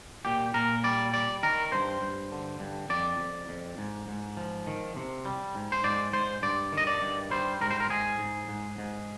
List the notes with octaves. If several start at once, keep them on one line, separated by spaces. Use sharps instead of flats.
A#2 G4
A#2 A#4
G3 D5
G3 D5
D#3 A#4
G2 C5
G2
D3
G2
F2 D5
F2
F2
G#2
G#2
F3
D#3
C3
G3
G#2
C5
G#2 D5
G#2 C5
G2 D5
D#3
D#5
D5
G2
G3 C5
G#2 A#4
C5
A#4
G#2 G#4
G#2
G#2
G#2